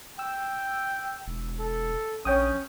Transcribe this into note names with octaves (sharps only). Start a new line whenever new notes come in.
G5 E6
E1
A4
A#1 C#4 C#5 G5 D#6